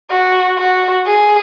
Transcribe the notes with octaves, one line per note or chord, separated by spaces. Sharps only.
F#4
F#4
G#4